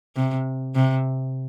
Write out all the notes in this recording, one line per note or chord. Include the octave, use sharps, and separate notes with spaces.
C3
C3